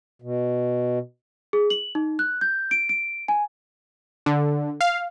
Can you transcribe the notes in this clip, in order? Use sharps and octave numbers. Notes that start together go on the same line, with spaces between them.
B2
G#4
F#7
D#4
F#6
G6
D7
D7
G#5
D3
F5